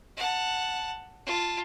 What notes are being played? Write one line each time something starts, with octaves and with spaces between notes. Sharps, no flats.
F#5 A5
F4 A5